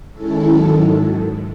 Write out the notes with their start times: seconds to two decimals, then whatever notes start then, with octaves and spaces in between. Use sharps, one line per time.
0.12 D#3 G#3 C#4 E4 A4
0.44 G#2 D#3 F#3